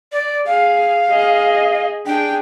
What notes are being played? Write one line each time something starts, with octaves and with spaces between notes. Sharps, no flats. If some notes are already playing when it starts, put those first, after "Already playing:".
D5
G#4 F5
G#4 D#5
D4 G#4 G5